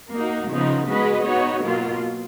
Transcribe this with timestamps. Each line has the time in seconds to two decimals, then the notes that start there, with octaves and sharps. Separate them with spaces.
0.12 A#3 D#4 F#4
0.50 C#3 F3 B3 D#4
0.86 G#3 B3 F#4 B4 D#5
1.24 B3 D#4 F#4 C#5
1.61 B2 F#3 A#3 F4